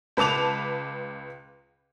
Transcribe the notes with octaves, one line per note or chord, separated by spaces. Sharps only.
C#2 B4 A5 D6 F7